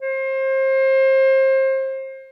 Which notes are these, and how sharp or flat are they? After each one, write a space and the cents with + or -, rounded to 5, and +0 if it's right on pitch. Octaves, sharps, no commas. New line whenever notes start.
C5 +30